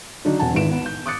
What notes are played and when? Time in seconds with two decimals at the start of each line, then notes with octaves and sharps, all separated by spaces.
0.25 D3 F#3 D4 D#4
0.39 E1 C3 F#5 G#5 A5
0.55 G#1 G#2 E4 B4 D7 E7
0.71 B3
0.86 G6
1.06 D6 D#6 F#6 A6 C#7